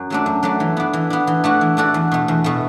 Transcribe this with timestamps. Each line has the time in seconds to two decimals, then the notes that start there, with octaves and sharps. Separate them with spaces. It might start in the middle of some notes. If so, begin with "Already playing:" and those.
Already playing: F#2
0.10 F#3 A3 D4
0.26 F#2
0.43 F#3 A3 D4
0.60 E3
0.77 B3 D4
0.93 E3
1.10 B3 D4
1.27 E3
1.44 A3 D4 F#4 A4
1.61 E3
1.77 A3 D4 F#4 A4
1.94 E2
2.12 B2 A3
2.28 E2
2.44 B2 A3